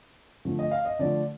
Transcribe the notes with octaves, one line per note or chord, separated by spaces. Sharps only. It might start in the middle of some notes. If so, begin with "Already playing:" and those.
D3 F3 A3
D#5
F5
D#5
D3 F3 A3 D5